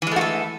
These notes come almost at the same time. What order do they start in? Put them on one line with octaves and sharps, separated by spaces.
E3 G#3 A3 F#4 A4